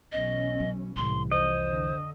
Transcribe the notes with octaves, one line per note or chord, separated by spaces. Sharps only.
B1 E3 C#4 D#5
F#3
C2 A2 E3 C6
F2 C5 D#5
D3